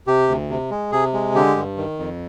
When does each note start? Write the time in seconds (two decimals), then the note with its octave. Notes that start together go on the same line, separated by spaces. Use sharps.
0.07 C3 G4
0.28 D2
0.50 C3
0.71 G#3
0.92 C3 G#4
1.13 G#3
1.35 D3 G4
1.56 G2
1.77 D#3
1.99 F2